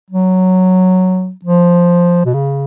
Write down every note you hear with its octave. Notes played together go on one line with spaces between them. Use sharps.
F#3
F3
B2
C#3